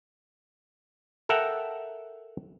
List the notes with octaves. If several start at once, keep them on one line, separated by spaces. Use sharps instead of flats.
A4 A#4 E5 F#5 G5 A#5